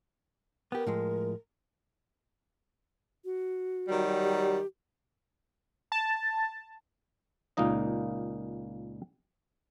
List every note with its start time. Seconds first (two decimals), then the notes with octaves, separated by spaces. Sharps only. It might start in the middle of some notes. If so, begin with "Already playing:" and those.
0.72 B3 G4 A#4
0.87 A2 F3 G#3
3.25 F#4
3.88 D#3 F#3 G3
4.23 G4
5.92 A5
7.57 C#2 A#2 A#3 D#4 D#5